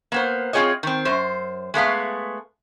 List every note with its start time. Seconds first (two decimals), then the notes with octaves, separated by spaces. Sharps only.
0.12 A#3 B3 C5
0.53 C4 F4 G#4 C#5 D#5
0.83 D#3 C4
1.05 F#2 C5
1.74 G#3 A3 B3 F5